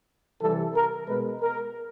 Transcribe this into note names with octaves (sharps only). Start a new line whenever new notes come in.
C3 E3 G3 A4
A#4
B2 G#3 B3 B4
A#4